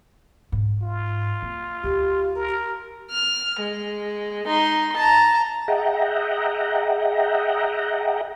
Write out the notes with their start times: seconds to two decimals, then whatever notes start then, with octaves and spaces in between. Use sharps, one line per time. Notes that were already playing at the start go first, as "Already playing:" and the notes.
0.52 G#2
0.82 F4
1.42 A#3
1.84 D2 G4
2.35 A#4
3.11 F6
3.60 G#3
4.47 D#4 C6
4.96 A5 A#5
5.68 G#4 D#5 E5 F#5 G5 A#5